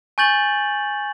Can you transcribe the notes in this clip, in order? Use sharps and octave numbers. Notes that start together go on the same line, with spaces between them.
G#5 C#6 G6 A6 F#7